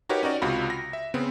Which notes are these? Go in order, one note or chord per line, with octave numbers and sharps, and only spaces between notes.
D#4 F#4 G4 A#4 B4 C#5
C#4 D#4 F#4 D5
C#2 C3 F4 F#4 B5
A#6
E5
C#3 B3 C4